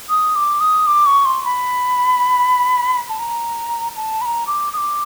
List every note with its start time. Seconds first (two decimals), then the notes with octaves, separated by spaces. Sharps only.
0.09 D#6
0.36 D6
0.61 D#6
0.87 D6
1.06 C#6
1.25 C6
1.45 B5
3.09 A5
3.19 A#5
3.96 A5
4.21 B5
4.26 A#5
4.47 D6
4.73 D#6
4.78 D6